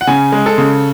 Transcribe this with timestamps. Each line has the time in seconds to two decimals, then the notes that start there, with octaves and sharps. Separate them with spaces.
0.01 F#5
0.07 C#3 G#5
0.32 G#3
0.46 A4
0.58 C#3